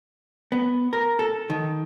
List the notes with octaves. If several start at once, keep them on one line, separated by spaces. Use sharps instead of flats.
B3
A#4
A4
D#3